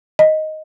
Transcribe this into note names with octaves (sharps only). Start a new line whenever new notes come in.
D#5